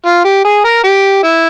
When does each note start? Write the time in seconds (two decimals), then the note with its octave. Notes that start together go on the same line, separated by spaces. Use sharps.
0.06 F4
0.25 G4
0.45 G#4
0.64 A#4
0.84 G4
1.23 E4